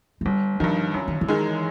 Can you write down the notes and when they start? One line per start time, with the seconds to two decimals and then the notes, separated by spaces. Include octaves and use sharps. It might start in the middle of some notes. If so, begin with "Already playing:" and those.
0.21 G#3
0.25 G1 G3
0.60 G2 D#3 F3
0.94 F#2 E3
1.08 D#3
1.21 E3
1.28 D#3 G#3